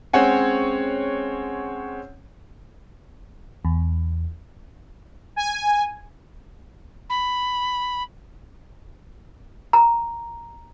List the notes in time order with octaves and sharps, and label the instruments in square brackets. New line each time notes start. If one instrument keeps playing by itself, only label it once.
[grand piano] G#3 C4 C#4 C#5 F#5 G#5
[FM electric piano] E2
[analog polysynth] G#5
[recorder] B5
[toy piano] A#5